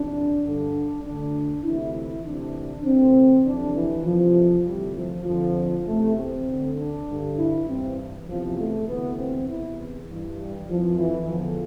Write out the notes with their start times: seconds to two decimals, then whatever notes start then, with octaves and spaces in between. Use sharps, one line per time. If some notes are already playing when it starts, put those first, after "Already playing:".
Already playing: F2 C3 E3 D4
0.44 G2 D3 D4
1.04 D2 D3 D4
1.64 D2 C3 E3 E4
1.94 E4
2.24 D2 C3 E3 D4
2.84 D2 C3 E3 C4
3.44 F2 C3 E3 D4
3.75 E3
4.05 F2 C3 E3 F3
4.66 D2 C3 E3 G3
4.95 F3
5.25 F2 D3 F3
5.86 E2 C3 E3 A3
6.16 C4
6.46 D2 D3
6.76 D4
7.07 G2 D3
7.37 E4
7.67 G2 E3 C4
8.27 E2 C3 E3 F3
8.57 A3
8.88 D2 C3 E3 B3
9.17 C4
9.48 E2 C3 E3 E4
10.08 G2 E3
10.39 G3
10.68 F2 E3 F3
10.98 E3
11.29 E2 D3 F3